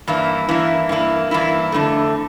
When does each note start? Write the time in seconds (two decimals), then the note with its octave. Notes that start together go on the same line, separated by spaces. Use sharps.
0.07 G2 E3 A#3 E4
0.49 G2 E3 A#3 E4
0.89 G2 E3 A#3 E4
1.31 G2 E3 A#3 E4
1.72 F2 D3 A3